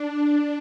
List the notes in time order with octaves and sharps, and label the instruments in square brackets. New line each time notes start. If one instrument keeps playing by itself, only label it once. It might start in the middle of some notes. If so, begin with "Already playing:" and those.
Already playing: [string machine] D4